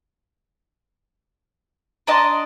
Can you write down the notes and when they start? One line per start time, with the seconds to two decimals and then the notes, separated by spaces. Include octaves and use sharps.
2.07 D4 D#5 A5 A#5 C6